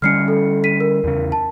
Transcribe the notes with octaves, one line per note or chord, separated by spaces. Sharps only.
D3 G3 C#4 F6 C7 C#7
A4
B6 D#7
A#4
E2 C#3
A5